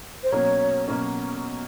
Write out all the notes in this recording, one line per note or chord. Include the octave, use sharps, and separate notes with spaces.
C5
B2 F#3 A#3 C#4 C#5
B2 F#3 A#3 C#4